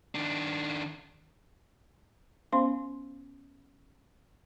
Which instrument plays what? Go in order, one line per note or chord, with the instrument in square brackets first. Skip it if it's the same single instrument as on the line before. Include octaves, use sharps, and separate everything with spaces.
[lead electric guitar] D#3 D4
[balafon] B3 C#4 C5 F5 C6